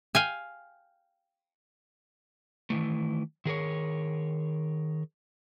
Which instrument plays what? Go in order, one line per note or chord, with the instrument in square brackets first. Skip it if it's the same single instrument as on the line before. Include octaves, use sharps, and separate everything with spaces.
[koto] F5 G5 G#5
[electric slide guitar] D#3 E3 A3
D#3 G#4 A#4 C#5